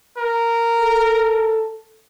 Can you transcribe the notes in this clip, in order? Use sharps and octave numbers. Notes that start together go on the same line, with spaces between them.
A#4
A4